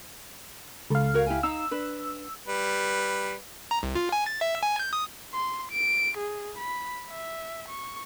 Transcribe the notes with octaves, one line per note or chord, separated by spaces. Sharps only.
C#2 A4 F5
F#4 A#4 C#5
E4 G4 G#5
D#4 F5 A#5 E6
D4 B4
G3 B4
A#5
C2
F4
G#5
A6
E5
G#5
G6
D#6
C6
D7
G#4
B5
E5
C#6